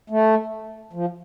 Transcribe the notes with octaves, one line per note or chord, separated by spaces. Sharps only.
A3
F3